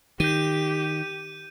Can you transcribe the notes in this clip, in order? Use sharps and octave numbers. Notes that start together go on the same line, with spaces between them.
D#3 G4 G6 D#7